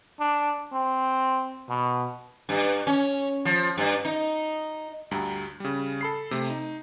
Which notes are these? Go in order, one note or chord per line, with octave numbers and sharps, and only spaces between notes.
D4
C4
B2
G2
C#4
F3
G2
D#4
D2 G2 G3 A#5
C#3 G3
A4 B5 C7
C3 A3
D#4